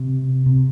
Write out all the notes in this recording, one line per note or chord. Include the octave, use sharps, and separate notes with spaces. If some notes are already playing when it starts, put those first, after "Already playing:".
Already playing: C3
C3